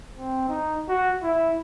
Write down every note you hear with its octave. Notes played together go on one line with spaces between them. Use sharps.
C4
D#4
F#4
E4